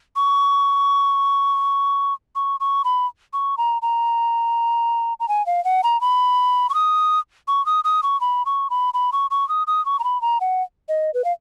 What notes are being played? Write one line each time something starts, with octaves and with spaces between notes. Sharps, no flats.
C#6
C#6
C#6
B5
C#6
A#5
A#5
A#5
G#5
F5
F#5
A#5
B5
C#6
D#6
C#6
D#6
D#6
C#6
B5
C#6
B5
B5
C#6
C#6
D#6
D#6
C#6
A#5
B5
A#5
F#5
D#5
B4
F5